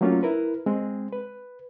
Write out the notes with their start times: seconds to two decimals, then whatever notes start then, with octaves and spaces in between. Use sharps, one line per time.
0.01 F#3 A3 A#3 C#4 D4 F4
0.23 E4 A#4 B4
0.66 G#3 C4
1.12 B4